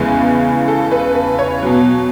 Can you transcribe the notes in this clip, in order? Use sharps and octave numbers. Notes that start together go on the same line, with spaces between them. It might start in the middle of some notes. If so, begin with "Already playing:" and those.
Already playing: E2 C#3 E3 G#3 B4
A4
B4
B4
C#5
B2 F#3